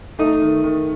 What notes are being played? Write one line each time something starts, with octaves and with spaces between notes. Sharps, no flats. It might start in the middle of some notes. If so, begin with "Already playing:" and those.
A3 D#4
D#3
D#3